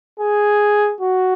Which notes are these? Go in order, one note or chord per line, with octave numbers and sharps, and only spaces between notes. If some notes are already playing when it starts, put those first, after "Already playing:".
G#4
F#4